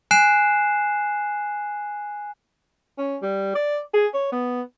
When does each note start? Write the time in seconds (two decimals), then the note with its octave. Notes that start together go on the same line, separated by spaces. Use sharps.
0.11 G#5 F#6 C7 E7
2.98 C#4
3.22 G3
3.55 D5
3.94 G#4
4.14 C#5
4.32 B3